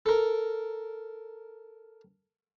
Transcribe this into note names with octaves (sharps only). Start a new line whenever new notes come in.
A4 A#4